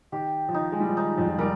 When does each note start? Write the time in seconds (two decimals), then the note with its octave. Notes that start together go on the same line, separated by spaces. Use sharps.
0.12 D#3 G4
0.49 F3
0.54 D#3 D#4
0.72 G#3
0.80 G3
0.89 F3
0.97 D#3 D#4
1.18 F2 F3
1.29 F3
1.38 G3 A#4